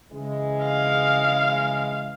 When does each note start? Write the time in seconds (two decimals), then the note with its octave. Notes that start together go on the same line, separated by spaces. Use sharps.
0.12 C#3 E3 G#3
0.64 F5